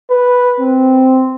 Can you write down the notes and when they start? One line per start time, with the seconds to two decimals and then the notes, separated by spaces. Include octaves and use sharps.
0.10 B4
0.60 C4